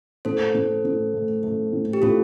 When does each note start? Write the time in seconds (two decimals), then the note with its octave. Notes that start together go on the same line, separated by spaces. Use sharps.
0.25 A2 A4 C5
0.55 A2
0.85 A2
1.14 A3
1.44 A3
1.73 A2
1.93 G4
2.02 A2 F4 A4